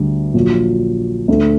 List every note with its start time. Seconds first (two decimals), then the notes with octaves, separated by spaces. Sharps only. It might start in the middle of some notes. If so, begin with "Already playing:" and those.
Already playing: D2 D3 G3
0.34 A#1 A#2 F#3
1.28 D2 D3 A3